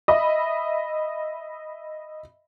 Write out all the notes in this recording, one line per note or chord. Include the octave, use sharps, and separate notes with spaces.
D#5 E5 B5